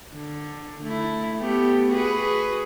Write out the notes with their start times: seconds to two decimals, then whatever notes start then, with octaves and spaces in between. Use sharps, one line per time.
0.13 D3
0.83 A3 E4
1.39 A3 B3 G4
1.91 F#4 G#4 B4